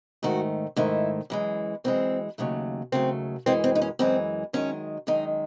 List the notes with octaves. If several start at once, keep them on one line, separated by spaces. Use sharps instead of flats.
G#2 D#3 A3 F#4
G#2 D#3 A3 E4
F#2 E3 G#3
F#2 E3 G#3 C4
D#2 C#3 F#3 A3
D#2 C#3 F#3 A3 C4
F#2 E3 G#3 C4
C4
D#4
C#4
F#2 E3 G#3 C4
F#2 D#3 G#3 C#4
F#2 D#3 G#3 D#4